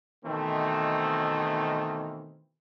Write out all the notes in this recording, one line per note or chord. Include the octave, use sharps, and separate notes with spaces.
B2 D#3 E3 A3 C4